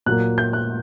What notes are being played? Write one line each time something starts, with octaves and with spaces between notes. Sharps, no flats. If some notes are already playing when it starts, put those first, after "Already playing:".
A#2 F#3 A#3 F#6
G6
F#6